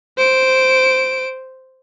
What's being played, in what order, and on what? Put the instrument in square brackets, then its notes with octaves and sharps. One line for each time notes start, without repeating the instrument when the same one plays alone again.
[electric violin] C5 D7